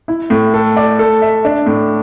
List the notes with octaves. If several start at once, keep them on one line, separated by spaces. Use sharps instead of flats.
E4
A2
A4
D5
A4
E5
D4
A2